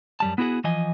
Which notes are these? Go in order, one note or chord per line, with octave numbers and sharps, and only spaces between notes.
F#2 G3 A5
B3 E4 F#4 G#4 F#5
E3 F3 D#5 G#5